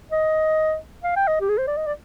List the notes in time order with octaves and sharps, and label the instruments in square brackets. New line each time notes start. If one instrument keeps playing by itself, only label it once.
[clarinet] D#5
F5
G5
D#5
G4
G#4
C5
D5
D#5
D5